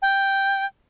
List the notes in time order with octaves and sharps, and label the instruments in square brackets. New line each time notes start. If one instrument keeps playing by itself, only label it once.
[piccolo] G5